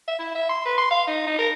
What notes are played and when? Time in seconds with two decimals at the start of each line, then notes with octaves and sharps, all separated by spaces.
0.08 E5
0.19 E4
0.35 E5
0.49 C6
0.65 B4
0.78 C6
0.91 F5
1.07 D#4
1.27 D#4
1.38 A#4